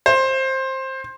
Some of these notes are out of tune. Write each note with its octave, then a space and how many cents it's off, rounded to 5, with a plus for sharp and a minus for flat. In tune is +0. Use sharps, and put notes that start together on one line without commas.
C5 +15